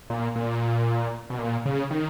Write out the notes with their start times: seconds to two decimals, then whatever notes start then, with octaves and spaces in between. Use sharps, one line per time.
0.10 A#2
0.36 A#2
1.30 B2
1.39 A#2
1.66 C#3
1.91 D#3